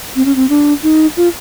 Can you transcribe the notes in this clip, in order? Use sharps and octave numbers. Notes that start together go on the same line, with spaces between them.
C4
C#4
C4
D4
D#4
F4